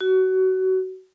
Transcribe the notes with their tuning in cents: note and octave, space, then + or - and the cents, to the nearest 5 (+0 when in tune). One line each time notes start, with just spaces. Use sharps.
F#4 +25